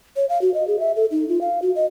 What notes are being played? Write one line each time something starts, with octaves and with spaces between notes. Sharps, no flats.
C#5
F5
F#4
D#5
G#4
E5
A4
D#4
F4
F5
F#4
D#5